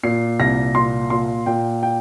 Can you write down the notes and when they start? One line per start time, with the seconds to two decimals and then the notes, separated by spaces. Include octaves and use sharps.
0.03 A#2 C7
0.40 C2 A#6
0.75 A#2 C6
1.10 A#2 C6
1.46 A#2 G5
1.83 G5